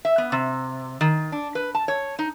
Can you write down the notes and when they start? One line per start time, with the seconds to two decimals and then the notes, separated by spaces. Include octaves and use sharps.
0.05 E5
0.18 B3
0.32 C3
1.01 D#3
1.32 D4
1.55 B4
1.75 A5
1.88 C#5
2.19 D#4